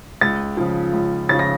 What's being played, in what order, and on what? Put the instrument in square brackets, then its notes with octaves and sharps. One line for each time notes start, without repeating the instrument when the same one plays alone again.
[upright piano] C#2 A6
C#3 F3
C#2
C#3 F3 A6
A#6